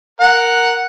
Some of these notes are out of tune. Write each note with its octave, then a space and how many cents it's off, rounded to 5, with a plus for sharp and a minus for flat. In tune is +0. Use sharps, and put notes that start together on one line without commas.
A#4 +0 F#5 +0